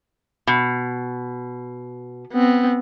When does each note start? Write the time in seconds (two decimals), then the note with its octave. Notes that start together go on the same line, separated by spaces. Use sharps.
0.47 B2
2.33 B3 C4